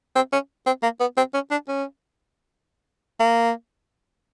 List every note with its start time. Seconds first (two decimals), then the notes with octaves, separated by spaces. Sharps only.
0.16 C4
0.33 C#4
0.66 C4
0.83 A#3
1.00 B3
1.17 C4
1.34 C#4
1.51 D4
1.68 C#4
3.20 A#3